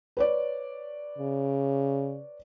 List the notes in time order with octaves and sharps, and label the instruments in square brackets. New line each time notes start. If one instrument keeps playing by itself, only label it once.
[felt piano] B4 C#5 D5
[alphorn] C#3